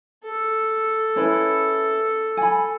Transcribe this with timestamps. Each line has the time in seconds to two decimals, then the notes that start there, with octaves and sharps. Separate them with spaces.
0.24 A4
1.16 C#4 E4 B4
2.37 G#5 B5